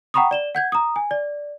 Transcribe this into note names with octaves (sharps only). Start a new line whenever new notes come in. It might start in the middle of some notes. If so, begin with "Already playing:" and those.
F#5 G5 A#5 B5 C#6 D#6
D5 E7 G7
F#5 G6 G#6
A#5 D#6
G#5
D5